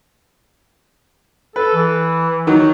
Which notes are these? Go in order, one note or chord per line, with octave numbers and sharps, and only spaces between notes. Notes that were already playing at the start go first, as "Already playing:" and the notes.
A4 B4
E3
D#3 F#3